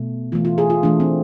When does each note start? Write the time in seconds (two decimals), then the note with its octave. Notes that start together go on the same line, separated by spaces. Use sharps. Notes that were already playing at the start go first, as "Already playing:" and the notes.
Already playing: B2 A3
0.32 E3 A3 F4
0.45 F4
0.58 G#4
0.70 F4
0.83 E3 A3 D4
1.00 C4